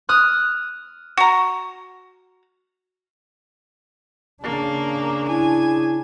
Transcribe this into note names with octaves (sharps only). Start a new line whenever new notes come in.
D#6 F6 F#6
F#4 A#5
C#3 A#3 D4
E4 G#5